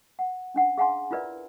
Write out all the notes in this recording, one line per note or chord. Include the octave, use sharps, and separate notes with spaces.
F#5
C#4 D4 F#5
G#4 F5 F#5 G#5 A#5 C6
E4 F4 A#4 B4 D5 E5